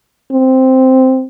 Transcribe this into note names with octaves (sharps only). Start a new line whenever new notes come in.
C4